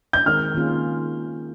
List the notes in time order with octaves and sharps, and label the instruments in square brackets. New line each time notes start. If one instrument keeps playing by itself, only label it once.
[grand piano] G6
[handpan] D#3 G#3 C4 D#4 A#4 [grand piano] F6
[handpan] D#3 A#3 C#4 F4 G#4